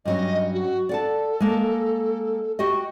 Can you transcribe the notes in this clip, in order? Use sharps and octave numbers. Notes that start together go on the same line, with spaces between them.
G2 F#3 C#4 D#5
F#4
A4 D5 F#5 A5
G#3 A#3 A5
F#4 G4 D#5 C#6